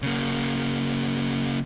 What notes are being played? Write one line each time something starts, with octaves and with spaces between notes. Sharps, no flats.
C#3 A#3